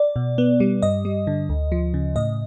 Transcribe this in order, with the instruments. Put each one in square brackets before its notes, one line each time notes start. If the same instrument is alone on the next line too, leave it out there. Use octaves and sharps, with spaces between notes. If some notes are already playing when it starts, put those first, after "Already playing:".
Already playing: [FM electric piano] D5
B2
B3
G3
G2 D#5
G3
D3
D2
F3
C#3
A2 D#5